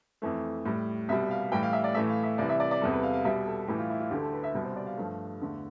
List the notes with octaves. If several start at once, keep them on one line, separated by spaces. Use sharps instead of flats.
F2 E3 A3
A2 G3
C2 B2 G3 E5
F5
A2 E3 G3 G5
F5
E5
D5
A2 E3 A3 E5
F5
E5
C2 C3 E3 D5
E5
D5
D5
E2 C3 G3 A4
B4
F5
F5
C2 B2 G3 E5
A4
A2 E3 G3 G4
F4
E4
F4
D2 D3 A3 G4
A4
B4
E5
C2 B2 G3
C5
D5
F5
G2 F3 A3
E2 D3 A3